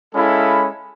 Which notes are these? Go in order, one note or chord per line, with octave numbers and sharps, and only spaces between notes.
G#3 C#4 E4 A4 F5 B5